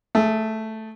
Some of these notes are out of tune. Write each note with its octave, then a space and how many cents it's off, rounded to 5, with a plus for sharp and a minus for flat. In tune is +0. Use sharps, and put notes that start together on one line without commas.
A3 +0 G#4 +25